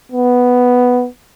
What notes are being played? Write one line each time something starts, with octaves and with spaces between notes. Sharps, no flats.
B3